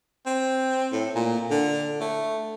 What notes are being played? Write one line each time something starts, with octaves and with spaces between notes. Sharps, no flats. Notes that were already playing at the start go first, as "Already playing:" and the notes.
C4
A2
A#2
D3
A3